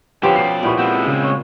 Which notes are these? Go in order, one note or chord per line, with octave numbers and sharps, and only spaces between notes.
D3 F3 B3 C#4 G4 B4 C6
B2 D5 C7
A#2 B3 E4 G4 C#6
G#3 C4 F#4
C#3
C#5